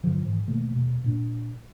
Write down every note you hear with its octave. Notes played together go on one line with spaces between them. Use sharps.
G2 D3 F3 F#3
G#2 D#3 E3
B2 D#3 A3 A#3
D#1 B2
A#2 D4